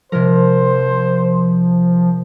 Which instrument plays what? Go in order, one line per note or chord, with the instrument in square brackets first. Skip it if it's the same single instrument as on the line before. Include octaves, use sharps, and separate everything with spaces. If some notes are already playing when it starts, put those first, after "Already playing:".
[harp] C3 G#3 A#4 [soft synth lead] F3 [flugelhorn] C5